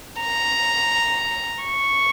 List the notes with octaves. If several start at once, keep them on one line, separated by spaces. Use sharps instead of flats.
A#5
C#6